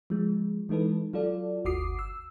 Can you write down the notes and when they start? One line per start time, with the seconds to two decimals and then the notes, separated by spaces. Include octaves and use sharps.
0.10 F3 G#3
0.69 E3 G#3 D#4 A4 B4
1.14 F#3 F4 A4 D5
1.65 G1 D#2 F#4 D6 D#6 C7
1.99 E6